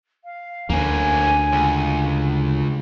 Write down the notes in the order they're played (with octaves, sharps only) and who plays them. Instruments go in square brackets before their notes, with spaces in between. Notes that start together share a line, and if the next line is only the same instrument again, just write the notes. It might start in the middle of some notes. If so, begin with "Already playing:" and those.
[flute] F5
[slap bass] D2 [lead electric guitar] A#3 C#4 [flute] G#5
[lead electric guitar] C#2